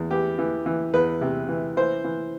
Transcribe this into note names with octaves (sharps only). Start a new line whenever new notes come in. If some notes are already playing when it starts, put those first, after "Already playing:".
Already playing: E2
E3 G4
E3
E3
E2 B4
C3
E3
E3 C5
E3